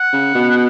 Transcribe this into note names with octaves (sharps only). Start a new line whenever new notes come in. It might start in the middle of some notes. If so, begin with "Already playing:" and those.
Already playing: F#5
C#3
B2